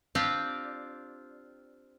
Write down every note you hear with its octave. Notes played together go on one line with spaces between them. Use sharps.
C4 D4 F4 G4 D5